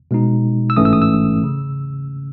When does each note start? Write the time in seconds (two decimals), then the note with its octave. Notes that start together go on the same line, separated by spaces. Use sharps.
0.11 B2 G#3 D#4
0.70 E6
0.77 A1 G#2 E3 A3 C#4 D#6
0.85 E6
0.93 D#6
1.02 E6
1.44 C#3